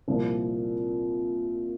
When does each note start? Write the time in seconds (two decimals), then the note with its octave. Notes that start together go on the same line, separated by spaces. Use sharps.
0.08 C2 A#2 F3 A#3